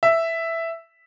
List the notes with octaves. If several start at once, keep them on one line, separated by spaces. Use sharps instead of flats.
E5